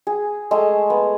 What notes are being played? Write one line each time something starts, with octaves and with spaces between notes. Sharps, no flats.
G#4
G#3 A3 G#4
B3